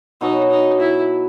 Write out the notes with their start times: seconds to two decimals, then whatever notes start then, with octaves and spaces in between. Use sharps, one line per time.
0.21 B2 F#3 B3 D#4
0.51 D#4
0.80 E4